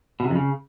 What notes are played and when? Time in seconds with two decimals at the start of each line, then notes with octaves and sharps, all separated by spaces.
0.20 B2
0.25 C3
0.30 F2
0.36 C#3